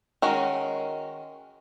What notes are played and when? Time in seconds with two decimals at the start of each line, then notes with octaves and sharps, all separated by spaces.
0.22 D#3 G#3 C#4 F#4 A#4